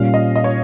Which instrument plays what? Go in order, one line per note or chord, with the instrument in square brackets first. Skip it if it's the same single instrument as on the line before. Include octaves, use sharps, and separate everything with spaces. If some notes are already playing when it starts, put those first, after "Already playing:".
Already playing: [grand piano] A#2 G3 C#4 F4 [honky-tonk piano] F5
[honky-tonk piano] D#5
D#5
C#5